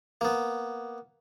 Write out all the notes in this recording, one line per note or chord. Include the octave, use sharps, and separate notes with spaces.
A#3 B3